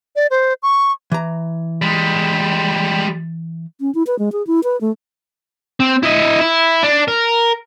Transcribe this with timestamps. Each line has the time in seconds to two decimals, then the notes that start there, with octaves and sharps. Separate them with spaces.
0.16 D5
0.31 C5
0.63 C#6
1.12 E3 A#5
1.82 G3 G#3
3.79 C#4
3.95 E4
4.07 B4
4.19 G#3
4.32 G#4
4.47 E4
4.64 B4
4.81 A3
5.80 C4
6.03 E4 D#5
6.41 E4
6.83 D4
7.08 A#4